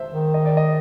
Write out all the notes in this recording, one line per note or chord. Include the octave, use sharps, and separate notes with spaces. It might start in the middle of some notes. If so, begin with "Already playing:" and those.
Already playing: C5 E5
D#3
D#5
D5
D#5